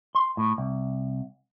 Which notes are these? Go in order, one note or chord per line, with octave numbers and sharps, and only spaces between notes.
C6
A2
C2